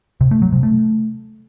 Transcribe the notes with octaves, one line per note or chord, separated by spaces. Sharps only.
C3
A3
F#3
C3
A3